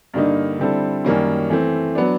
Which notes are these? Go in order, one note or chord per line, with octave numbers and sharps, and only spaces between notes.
G2 D3 G3 A#3 D#4
D3 G3 C4 E4 A4
F#2 D#3 G3 A#3 C#4
E3 A3 C4
F#3 B3 D4